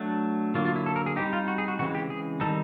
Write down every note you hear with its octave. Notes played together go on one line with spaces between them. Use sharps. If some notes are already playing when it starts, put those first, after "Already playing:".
Already playing: F#3 A3 D4
D3 F#3 A#3 F4
F4
E4
A4
A#4
G#4
G3 C4 D#4 G4
F4
F#4
G#4
F#4
C#3 E3 G#3 C4 F#4
G4
G#4
D#3 G3 C4 D#4 A4